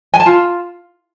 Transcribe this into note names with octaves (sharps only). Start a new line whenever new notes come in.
G#5
A5
F4